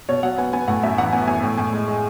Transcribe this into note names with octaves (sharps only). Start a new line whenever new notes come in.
B2 C#5
F#3 F#5
B3 G#5
B3 G#5
A2 F#5
F#2 E5
E3 F#5
B3 G#5
F#2 G#5
A2 G#5
A2 G#5
G#3
G#3